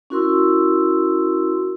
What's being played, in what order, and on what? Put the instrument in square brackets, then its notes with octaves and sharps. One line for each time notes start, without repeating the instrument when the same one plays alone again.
[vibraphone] C#4 E4 F#4 A#4 C6 E6